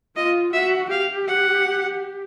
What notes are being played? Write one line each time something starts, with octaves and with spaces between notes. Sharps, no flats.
F4 D#5
F#4 E5
G4 F5
F#5